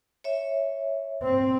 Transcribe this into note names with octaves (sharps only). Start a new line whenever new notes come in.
C#5 E5
C4